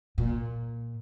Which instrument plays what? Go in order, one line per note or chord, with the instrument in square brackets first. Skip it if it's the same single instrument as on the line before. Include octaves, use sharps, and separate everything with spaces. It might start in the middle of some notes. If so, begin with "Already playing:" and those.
[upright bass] A#2